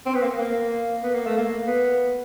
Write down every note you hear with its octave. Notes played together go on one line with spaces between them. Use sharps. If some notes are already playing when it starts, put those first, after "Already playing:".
C4
B3
A#3
A#3
B3
A#3
A3
A#3
B3